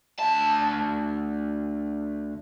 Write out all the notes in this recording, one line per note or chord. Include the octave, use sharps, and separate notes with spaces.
D2 A5